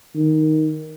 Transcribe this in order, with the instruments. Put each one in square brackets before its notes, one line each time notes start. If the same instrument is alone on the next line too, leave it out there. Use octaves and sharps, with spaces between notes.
[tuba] D#3